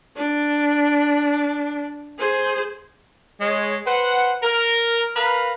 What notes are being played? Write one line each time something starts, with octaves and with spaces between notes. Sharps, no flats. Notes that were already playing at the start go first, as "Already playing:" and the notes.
D4
G#4 C5
G#3 C#5
B4 C5 F#5
A#4
A#4 B4 F5 A#5